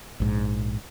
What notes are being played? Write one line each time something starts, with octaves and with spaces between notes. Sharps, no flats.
A#1 G#2